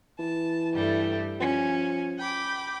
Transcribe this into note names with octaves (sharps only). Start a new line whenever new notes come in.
E3 A5
G2 G3 A3
F3 C#4
G5 B5 D6